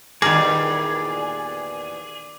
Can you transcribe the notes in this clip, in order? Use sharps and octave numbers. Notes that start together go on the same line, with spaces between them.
E2 A#2 D#3 G3 G#4 A#4 D6